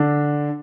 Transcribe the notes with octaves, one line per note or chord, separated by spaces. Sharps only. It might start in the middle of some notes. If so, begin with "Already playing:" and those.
Already playing: D3 D4